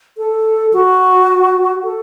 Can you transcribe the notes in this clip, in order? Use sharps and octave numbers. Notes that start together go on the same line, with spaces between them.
A4
F#4
A4